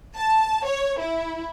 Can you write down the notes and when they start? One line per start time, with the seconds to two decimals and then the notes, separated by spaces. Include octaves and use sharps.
0.18 A5
0.68 C#5
1.01 E4